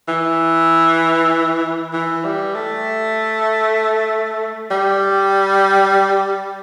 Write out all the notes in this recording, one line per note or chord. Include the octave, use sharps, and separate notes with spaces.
E3
E3
G3
A3
G3